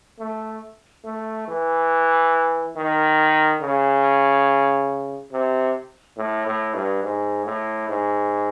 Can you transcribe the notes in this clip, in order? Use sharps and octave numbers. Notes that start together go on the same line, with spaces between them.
A3
A3
E3
D#3
C#3
C3
A2
A2
G2
G#2
A2
G#2